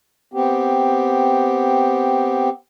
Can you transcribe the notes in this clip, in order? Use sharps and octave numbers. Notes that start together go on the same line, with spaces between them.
B3 C4 G4